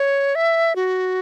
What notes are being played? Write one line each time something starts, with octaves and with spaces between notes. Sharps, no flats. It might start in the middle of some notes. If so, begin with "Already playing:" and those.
Already playing: C#5
E5
F#4